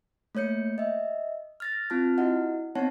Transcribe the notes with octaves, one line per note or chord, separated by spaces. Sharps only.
A3 A#3 C#5 G6 C#7
D#5 E5
F6 A6 A#6
C4 F4 A5 F6
E4 F#4 D#5 F#5
B3 C4 D#4 C#5 F#5 A5